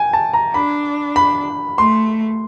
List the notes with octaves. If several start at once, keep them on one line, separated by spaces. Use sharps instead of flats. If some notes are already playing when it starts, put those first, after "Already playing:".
Already playing: G5 G#5
A5
A#5
D4 B5
B5
A3 C6